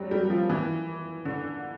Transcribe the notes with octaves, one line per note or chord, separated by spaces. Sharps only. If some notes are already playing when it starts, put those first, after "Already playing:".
Already playing: F#3 G3
G3
F3
E3
D3